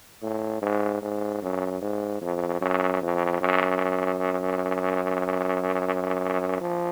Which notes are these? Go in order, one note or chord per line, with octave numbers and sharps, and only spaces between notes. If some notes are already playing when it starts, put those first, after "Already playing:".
A2
G#2
G#2
F#2
G#2
F2
F#2
F2
F#2
F3